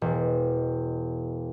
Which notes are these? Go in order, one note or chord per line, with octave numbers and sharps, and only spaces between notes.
E1